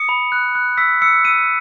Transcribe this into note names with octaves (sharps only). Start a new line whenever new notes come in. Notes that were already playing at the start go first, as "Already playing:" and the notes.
Already playing: D#6 C#7
B5
F#6
F#6
E6 B6
E6 C#7
E6 D#7